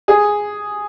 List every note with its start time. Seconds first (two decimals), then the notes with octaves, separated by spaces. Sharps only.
0.08 G#4